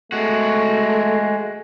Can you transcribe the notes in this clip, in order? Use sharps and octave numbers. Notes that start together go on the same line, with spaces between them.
G#3 A3 F#4